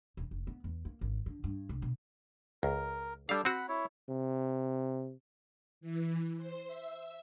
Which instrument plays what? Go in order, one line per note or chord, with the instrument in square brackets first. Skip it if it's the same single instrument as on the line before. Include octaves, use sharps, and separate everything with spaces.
[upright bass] D#1
F1
B3
E2
A#3
G#1
D3
G2
C2
B2
[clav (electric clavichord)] C#2 [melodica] A#4
[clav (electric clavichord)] G3 F5 [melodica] D4 A4
[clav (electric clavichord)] C4 F#4 [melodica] F#5 B5
[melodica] E4 C#5
[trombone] C3
[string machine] E3
C5
E5